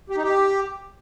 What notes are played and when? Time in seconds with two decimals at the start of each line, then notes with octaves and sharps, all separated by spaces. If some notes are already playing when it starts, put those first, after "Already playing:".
0.10 G4
0.17 D#4
0.23 G4